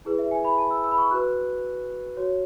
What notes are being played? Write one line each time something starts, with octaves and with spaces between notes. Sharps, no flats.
E4 G#4 B4
E5
G#5
B5
A5
E6
E6
B5
C#6
F#4 B4 F#6
F#4 C#5